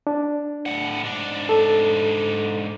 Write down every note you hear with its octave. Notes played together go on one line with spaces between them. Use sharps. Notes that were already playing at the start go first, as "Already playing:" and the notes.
D4
A2 F#5
G#2 D4
A4